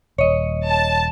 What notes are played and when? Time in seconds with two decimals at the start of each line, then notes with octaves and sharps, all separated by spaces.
0.18 D#1 C#5 D#5
0.69 A5